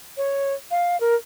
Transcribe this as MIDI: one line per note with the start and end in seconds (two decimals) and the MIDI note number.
0.17 0.54 73
0.71 0.99 77
1.00 1.15 70